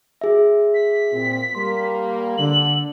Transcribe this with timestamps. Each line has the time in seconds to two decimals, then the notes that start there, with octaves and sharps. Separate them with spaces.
0.21 F#4 G#4 E5
0.74 B6
1.12 A#2 C4
1.55 G3 A#3 C6
2.38 D3 F#7